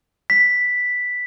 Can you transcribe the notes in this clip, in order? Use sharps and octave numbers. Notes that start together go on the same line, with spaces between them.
B6